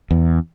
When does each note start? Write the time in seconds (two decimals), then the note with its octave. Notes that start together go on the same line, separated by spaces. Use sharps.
0.11 E2